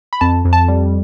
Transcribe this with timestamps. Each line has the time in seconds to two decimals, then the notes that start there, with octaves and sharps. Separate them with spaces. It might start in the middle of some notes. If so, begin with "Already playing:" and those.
0.13 B5
0.21 F2 A5
0.45 F2
0.53 A5
0.68 G3